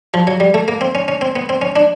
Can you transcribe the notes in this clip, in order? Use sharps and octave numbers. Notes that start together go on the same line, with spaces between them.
F3
F#3
G3
A3
A#3
C4
C#4
C#4
C4
B3
C4
C#4
D4